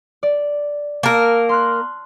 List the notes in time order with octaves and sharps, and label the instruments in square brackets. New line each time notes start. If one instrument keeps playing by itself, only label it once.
[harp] D5
[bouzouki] A#3 A#4 [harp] A5 E6
[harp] C6 F6 F#6